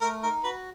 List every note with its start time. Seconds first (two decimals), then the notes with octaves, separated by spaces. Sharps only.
0.01 A3 A#4
0.23 D#4 A#4
0.43 F#4 B4